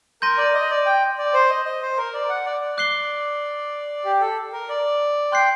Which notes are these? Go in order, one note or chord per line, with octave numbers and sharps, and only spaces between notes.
A#4 C6 G6 A#6 D#7
D5
D#5
D5
G5
D5
C5
D#5
D#5
C5
A#4
D5
F#5
D5
D5
D6 F#6 C7 G7
G4
A4
A#4
D5
G5 C6 F#6 C7